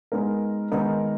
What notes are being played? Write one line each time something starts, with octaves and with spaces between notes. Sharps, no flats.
G#3 B3 D#4 A#4
D#3 G#3 B3 D#4 A#4